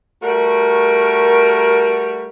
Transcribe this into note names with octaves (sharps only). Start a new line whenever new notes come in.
G3 A3 F#4 A#4